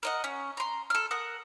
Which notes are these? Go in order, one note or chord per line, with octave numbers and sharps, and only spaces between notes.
A#4 D#5 F#5
C#4
A#5 C6
A4 F6
A#4 F#5 D#6